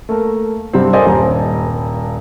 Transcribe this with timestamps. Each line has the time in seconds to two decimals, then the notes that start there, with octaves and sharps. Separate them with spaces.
0.09 A3 A#3 A#4
0.73 G2 C3 C4
0.93 A4 A#4 C5 D5 D#5 G#5
1.05 D#1 G2 A#5